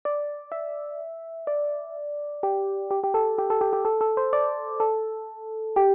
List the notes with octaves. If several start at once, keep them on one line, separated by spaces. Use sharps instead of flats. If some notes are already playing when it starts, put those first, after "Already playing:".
D5
E5
D5
G4
G4
G4
A4
G4
A4
G4
G4
A4
A4
C5
D5
A4
G4